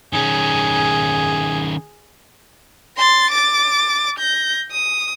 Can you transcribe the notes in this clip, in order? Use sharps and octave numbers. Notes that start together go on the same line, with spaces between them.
D#3 C#4 G#4
C6 A6
D6 A6
G6 A#6
D#6